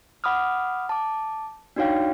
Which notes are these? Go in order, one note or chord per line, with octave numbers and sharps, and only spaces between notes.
F#5 B5 D6 D#6 F6
A5 D6
D4 D#4 F#4 C#5 F5 G5